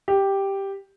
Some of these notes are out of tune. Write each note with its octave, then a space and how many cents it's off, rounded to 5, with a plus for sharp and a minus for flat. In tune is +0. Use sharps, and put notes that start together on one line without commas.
G4 +0